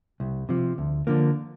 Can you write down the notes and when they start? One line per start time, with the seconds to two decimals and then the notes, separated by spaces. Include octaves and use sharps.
0.20 C2
0.49 C3 F3
0.78 D2
1.07 D3 F3 A#3